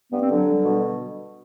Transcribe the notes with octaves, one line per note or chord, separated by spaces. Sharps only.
G2 B3
C4
D3 F#3 D4
G3
B2